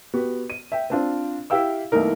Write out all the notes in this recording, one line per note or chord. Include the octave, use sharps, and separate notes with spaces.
B3 F#4 G4
D#7
E5 G5
C4 D4 F4
E4 G4 E5 F5 G5 E6
C2 E3 A3 A#3 D#4 A#4